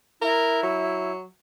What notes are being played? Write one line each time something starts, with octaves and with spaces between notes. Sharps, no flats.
E4 A#4
F#3